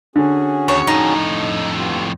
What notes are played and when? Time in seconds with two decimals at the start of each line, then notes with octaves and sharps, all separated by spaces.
0.16 D3 C#4 F#4 G#4
0.68 D#2 C#5
0.87 F2 A2 D#4
1.76 B3 F4 G4